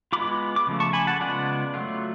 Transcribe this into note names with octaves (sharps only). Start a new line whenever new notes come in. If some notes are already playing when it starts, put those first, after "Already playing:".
G#3 B3 F4 B5 D6
D6
C#3 F3 A3
A5 C#6
G#5 B5
F#5 A5
C#3 G#3 B3 F4 D5 F#5
F#3 A3 F4